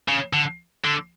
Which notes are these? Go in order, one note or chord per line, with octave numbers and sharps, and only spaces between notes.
C#3
D3
D3